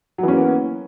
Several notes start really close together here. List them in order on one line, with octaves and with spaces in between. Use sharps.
F#3 E3 C#4 A#3 B3